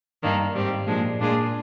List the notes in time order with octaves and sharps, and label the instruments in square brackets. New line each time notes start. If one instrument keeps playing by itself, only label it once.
[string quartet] G2 D#3 A#3 D4
G#2 G3 C4 G4
A#2 F3 G#3 D4 G#4
A#2 G#3 D4 F4 G#4